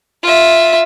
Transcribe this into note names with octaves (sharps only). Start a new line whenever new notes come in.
F4 E5